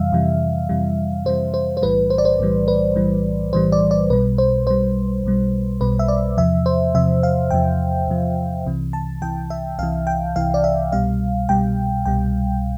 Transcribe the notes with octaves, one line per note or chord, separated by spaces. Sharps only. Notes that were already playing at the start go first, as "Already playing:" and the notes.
Already playing: F2 C3 E3 G3 E5 F5
F2 C3 E3 G3
F2 C3 E3 G3
F2 C3 E3 G3 C5
C5
C5
B1 A2 E3 G3 B4
C5
D5
C5
B1 A2 E3 G3
B4
B1 A2 E3 G3
B1 A2 E3 G3 C5
D5
D5
B1 B2 G3 B4
C5
B1 B2 G3 C5
B1 B2 G3
B1 B2 G3 B4
E5
D5
E2 C3 F3 E5
C5
E2 C3 F3 E5
F5
E2 C3 F3 G5
E2 C3 F3
C2 C3 E3
A5
C2 C3 E3 G5
E5
C2 C3 E3 F5
G5
C2 C3 E3 F5
D5
E5
C2 B2 G3 F5
C2 B2 G3 G5
C2 B2 G3 G5